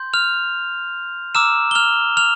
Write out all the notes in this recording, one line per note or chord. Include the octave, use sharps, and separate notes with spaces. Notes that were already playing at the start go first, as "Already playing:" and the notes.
Already playing: C6 G6
F6 F7
A#5 D6 E6 F6 E7
G7
F6 F7
F6 F7